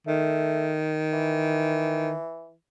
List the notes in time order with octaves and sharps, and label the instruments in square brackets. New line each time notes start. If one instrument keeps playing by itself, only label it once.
[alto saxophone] D#3 [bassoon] A3
[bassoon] E3